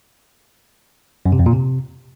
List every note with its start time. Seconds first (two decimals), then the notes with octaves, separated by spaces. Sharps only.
1.26 F#2
1.32 C3
1.39 F2
1.46 A#2
1.53 C3